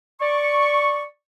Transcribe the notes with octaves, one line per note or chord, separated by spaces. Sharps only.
D5 C#6